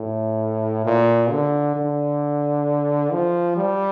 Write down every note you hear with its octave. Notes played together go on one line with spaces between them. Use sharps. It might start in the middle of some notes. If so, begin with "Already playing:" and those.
Already playing: A2
A#2
D3
D3
F3
G3